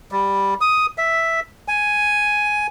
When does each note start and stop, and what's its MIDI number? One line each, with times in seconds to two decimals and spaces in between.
0.12 0.54 55
0.61 0.86 87
0.98 1.40 76
1.68 2.67 80